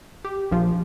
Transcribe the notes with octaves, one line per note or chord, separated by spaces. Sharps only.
G4
A#1 F3